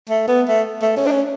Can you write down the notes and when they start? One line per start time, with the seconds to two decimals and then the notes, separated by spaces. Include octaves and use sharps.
0.09 A3
0.28 B3
0.48 A3
0.82 A3
0.97 C#4
1.07 D4
1.11 C#4